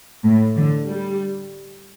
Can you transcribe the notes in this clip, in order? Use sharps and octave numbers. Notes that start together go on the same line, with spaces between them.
A2
D3
G3